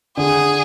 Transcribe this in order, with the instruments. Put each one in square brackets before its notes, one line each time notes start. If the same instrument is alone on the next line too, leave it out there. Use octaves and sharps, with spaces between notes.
[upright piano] D3 [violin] G#4